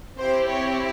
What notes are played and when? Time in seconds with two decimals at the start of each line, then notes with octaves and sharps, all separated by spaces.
0.17 C4 E4 G4 C5
0.48 C#5